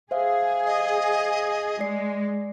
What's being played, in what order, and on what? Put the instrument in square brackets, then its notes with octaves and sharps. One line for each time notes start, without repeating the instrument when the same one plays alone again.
[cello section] G#4 [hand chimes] C5 E5 F5
[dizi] D#5
[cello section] G#3 [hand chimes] D5 C7